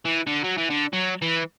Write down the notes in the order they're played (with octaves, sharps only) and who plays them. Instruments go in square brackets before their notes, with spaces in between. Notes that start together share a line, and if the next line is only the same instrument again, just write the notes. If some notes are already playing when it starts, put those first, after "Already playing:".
[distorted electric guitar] E3
D3
F#3
E3
D3
F#3
E3